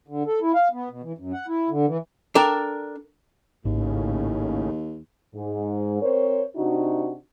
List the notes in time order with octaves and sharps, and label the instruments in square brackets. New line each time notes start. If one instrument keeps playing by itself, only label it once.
[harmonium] D3
A4
E4
F5
B3
B2
E3
F#2
F#5
E4
D3
E3
[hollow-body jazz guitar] D4 A4 A#4 G5
[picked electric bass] G#1 [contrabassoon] D#2 [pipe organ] A2 C#3
[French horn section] G#2
C4 A#4 C5 C#5
C3 D4 D#4 F#4